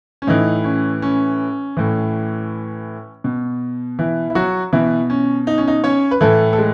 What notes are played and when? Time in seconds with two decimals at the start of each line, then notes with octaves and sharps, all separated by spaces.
0.22 C#4
0.27 A2 E3 D#4
0.64 C#4
1.02 C#4
1.77 A2 E3
3.24 B2
3.99 E3 E4
4.30 E4
4.35 F#3 F#4
4.73 B2 E3 E4
5.10 C#4
5.47 D#4
5.58 C#4
5.68 D#4
5.84 C#4 C#5
6.11 B4
6.21 A2 E3 A3 A4
6.53 A4
6.58 G#3